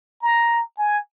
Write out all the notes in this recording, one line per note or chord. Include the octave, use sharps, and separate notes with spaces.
A#5
G#5